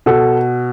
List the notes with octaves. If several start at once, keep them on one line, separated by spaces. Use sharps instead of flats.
B2 A4